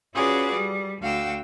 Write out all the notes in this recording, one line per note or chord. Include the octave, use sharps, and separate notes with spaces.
C#4 F4 F#4 G#4 B4 D5
G3
D2 F#4 F5 G5 E6